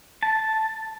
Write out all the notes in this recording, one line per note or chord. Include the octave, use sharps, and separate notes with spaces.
A5